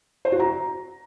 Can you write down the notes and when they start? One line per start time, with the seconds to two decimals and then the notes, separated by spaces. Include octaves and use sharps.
0.25 C5
0.32 F#4
0.40 A#5